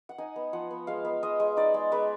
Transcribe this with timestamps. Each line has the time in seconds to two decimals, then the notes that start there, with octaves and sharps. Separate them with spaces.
0.09 F#5
0.18 D#4 G#5
0.36 B3
0.53 F3 F#5
0.71 B3
0.87 G#3 F5
1.05 B3
1.23 G#3 D#5
1.40 G#3
1.57 D#4 D5
1.74 G#3
1.92 G#3 B4